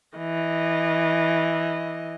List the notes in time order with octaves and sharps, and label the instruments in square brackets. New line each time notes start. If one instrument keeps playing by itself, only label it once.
[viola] E3 D#5